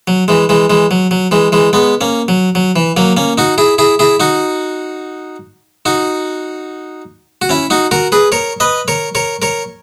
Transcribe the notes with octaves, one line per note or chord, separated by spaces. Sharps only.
F#3
E3 G#3
E3 G#3
E3 G#3
F#3
F#3
E3 G#3
E3 G#3
G#3 B3
A#3 C#4
F#3
F#3
E3
F#3 A#3
A#3 C#4
D#4 F#4
E4 G#4
E4 G#4
E4 G#4
D#4 F#4
D#4 F#4
F#4
C#4 E4
D#4 F#4
F#4 A#4
G#4 B4
A#4 C#5
B4 D#5
A#4 C#5
A#4 C#5
A#4 C#5